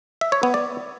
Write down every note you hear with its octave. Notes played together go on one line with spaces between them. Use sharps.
E5
C#5
B3
D5